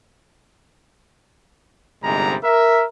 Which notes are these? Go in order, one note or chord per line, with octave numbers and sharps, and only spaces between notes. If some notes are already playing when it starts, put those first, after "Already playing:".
G1 G#2 C3 G3 G#3 A#5
A#4 E5